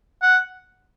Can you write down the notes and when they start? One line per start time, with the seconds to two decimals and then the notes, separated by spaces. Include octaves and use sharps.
0.23 F#5